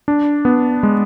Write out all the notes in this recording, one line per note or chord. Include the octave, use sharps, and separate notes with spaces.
D4
B3
G#3